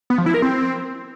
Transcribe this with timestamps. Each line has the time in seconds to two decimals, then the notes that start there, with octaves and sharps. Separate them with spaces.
0.10 B3
0.18 F3
0.26 E4
0.34 A#4
0.42 C4